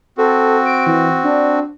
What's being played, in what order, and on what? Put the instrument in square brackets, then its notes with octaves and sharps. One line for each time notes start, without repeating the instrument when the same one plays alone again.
[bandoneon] C4 F#4 [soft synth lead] A4
[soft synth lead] D7
E3
D4